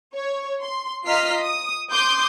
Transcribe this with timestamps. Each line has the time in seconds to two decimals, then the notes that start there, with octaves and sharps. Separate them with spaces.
0.14 C#5
0.61 C6
1.05 F4 D#5 A#5 F6 B6 C7
1.41 D#6
1.90 C6 D6 D#6 G6